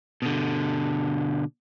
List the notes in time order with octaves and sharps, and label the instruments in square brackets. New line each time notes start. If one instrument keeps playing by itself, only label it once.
[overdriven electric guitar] B2 D3